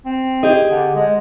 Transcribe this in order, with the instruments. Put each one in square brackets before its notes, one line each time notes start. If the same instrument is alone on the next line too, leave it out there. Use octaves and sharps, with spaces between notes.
[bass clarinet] C4
[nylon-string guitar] G4 G#4 D#5
[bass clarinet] D3
G#3